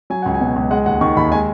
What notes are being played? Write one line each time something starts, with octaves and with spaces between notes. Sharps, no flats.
F#3 G#5
C#2 F#5
G#5
B2
C#2
G#3 F#5
D#2 F#5
D#3 C#6
D#2 B5
G#3 G#5